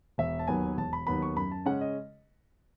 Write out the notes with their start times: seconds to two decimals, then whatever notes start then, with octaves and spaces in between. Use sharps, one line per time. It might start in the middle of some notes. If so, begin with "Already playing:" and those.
0.18 E1 E5
0.39 A5
0.47 D#2 D#3 F#3 B3 G#5
0.77 E1 A5
0.93 B5
1.07 D#2 D#3 F#3 B3 B5
1.22 C#6
1.36 F#2 B5
1.51 A5
1.65 C#3 G#3 C#4 F#5
1.81 D#5